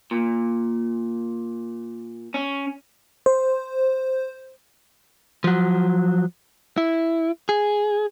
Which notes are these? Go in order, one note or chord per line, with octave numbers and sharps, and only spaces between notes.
A#2
C#4
C5
F3 F#3
E4
G#4